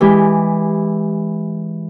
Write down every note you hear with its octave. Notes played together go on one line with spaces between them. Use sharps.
E3 G#3 E4 G4